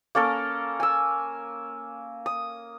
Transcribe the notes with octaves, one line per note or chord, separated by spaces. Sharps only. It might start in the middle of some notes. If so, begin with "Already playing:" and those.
A#3 C#4 A4 A#4
G#5 E6
D#6